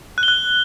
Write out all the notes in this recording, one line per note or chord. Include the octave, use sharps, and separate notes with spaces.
F#6
G7
F#6